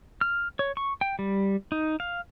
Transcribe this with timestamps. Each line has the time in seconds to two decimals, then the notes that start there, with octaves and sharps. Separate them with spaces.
0.21 F6
0.59 C#5
0.77 C#6
1.01 G5
1.19 G3
1.72 D#4
2.00 F5